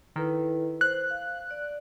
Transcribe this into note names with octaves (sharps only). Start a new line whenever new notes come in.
D#3 E4 A4 B4
C5 F#6
F5
D5